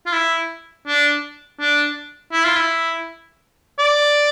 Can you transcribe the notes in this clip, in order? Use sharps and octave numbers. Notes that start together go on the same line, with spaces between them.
F4
E4
D4
D4
E4
F4
E4
D5